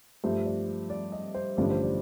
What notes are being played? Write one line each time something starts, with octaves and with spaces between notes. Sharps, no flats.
G2 F3 A3 C5
D5
D5
D#5
C5
A1 G2 D3 F3 D5
C5
D5